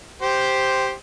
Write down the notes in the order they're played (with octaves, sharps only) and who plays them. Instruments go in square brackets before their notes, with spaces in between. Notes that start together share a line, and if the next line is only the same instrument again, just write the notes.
[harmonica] G4 C5